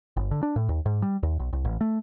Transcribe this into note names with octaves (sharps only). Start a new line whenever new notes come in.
G1
D3
D4
A2
D#2
G#2
G3
D#2
B1
C2
A1
A3